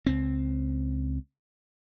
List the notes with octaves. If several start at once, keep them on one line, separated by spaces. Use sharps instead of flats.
C#2 C4